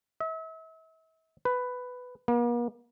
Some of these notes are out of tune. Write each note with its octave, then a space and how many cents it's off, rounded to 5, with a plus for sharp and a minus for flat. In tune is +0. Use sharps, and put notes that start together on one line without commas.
E5 -40
B4 +10
A#3 +45